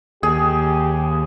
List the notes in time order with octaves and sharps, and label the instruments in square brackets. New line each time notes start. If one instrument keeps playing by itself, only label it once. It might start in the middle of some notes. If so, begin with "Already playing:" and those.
[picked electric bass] D#2 [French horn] G4 [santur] G#4